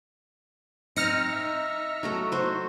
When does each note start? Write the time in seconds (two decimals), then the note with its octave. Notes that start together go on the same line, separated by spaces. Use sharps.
0.96 C4 D#4 F6 A#6 C#7
1.32 E5
2.03 F#3 A3 A4
2.32 F#4 C5